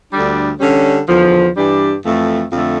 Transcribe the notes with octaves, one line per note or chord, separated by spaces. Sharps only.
D2 D3 G3 D4
D3 G3 C#4
E2 D3 F3
G2 E3 G3 D4 G4
F2 E3 A3
F2 D3 A3